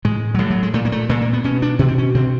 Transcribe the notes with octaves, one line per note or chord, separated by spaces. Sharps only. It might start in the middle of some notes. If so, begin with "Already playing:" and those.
A2 G#3
F#3
A2 G3
F#3
G#3
A#2 A3
A#3
A3
A#2 A3
A#3
B3
B2 C#4
D4
B2 C#4
C4
C#4
B2 C4